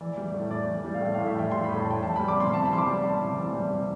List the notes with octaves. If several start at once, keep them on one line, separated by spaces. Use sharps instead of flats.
E3 D5
G3
A2
A2 D5
E3
G3
F5
A2 G5
A2 F5
E5
E3 G5
G3 C6
A2 B5
A5
A2 G5
E3 A5
G3 B5
D6
C3 C6
C3 A5
B5
E3 C6
D6
G3
C3 A5
C3
E3
G3
C3